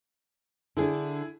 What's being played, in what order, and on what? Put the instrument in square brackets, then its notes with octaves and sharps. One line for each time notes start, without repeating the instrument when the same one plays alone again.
[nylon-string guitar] D3 D4 [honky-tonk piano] E4 G#4